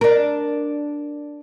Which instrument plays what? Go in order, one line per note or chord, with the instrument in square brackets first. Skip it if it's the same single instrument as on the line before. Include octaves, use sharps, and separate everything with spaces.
[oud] D4 A#4